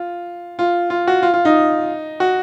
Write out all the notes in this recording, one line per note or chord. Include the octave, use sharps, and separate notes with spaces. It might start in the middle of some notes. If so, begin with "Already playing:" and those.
Already playing: F4
F4
F4
F#4
F4
F4
D#4
F#4